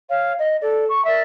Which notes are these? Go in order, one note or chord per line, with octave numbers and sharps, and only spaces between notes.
C#5 F5
D#5
A4 D5
C#6
A#4 D5 E5